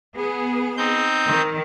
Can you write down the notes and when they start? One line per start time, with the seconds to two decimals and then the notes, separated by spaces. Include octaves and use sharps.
0.16 B3 G#4
0.77 C4 D#4 G6
1.26 D#3